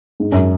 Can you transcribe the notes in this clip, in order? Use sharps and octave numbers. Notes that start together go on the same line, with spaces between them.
G#2
F#2